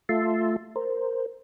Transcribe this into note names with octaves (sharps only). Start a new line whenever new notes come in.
A3 F4 E5 A5 C6
A#4 C5